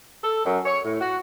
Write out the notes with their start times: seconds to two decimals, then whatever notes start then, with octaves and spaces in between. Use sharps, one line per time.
0.23 A4
0.46 F#2
0.66 C#5
0.85 A2
1.01 F#4